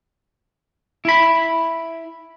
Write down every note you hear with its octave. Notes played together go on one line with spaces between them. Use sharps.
E4 B5